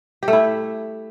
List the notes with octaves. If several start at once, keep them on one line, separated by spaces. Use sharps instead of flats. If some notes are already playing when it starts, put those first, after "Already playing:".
G4
A3
E4